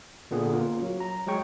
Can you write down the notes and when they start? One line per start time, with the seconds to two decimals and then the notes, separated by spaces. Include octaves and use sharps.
0.31 A#2 D3 B3 F4 G#4
0.53 A#3 C#4 F4
0.82 F#3
1.00 A#5
1.27 F#3 G#3 G#4 C#5 G5 C#6